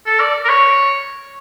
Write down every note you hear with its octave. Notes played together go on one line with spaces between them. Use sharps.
A4
D5
A#4
C#5